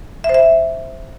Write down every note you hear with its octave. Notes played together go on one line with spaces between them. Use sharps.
E5
C5
E5